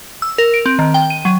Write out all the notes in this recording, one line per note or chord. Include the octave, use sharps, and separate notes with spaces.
E6
A#4
D7
C4
D#3
G5
D#7
F#3